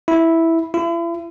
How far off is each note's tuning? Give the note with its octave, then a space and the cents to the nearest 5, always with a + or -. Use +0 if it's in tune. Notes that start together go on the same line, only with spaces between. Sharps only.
E4 -5
E4 +40